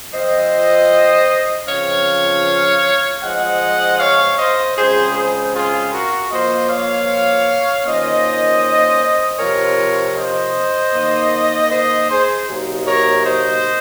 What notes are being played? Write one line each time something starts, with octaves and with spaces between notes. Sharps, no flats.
F3 C4 F4 C5 D#5
C#3 F3 C4 F4 C#5 F5
F3 G#3 C4 D#5 F#5
C#5 F5
C5 D#5
C#3 G#3 C4 F4 G#4 C5
G#4 C5
F4 G#4
F#4 A#4
F3 A#3 F4 C5 D#5
C#5 F5
D#3 A#3 C#4 F4 C5 D#5
C3 F3 C4 F4 A#4 C#5
C5 D#5
D#3 A#3 D#4
C5 D#5
G#4 C5
C3 F#3 A#3 D#4
A#4 C#5
C5 D#5